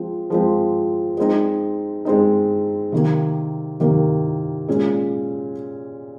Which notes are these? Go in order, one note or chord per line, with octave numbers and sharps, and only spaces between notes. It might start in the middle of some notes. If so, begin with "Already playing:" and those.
Already playing: F3 G#3 C4
F3 G#3 C4
G#3 C4 D#4
G#3 C4 D#4
C3 D#3 A#3
C3 D#3 A#3
A#2 G#3 C#4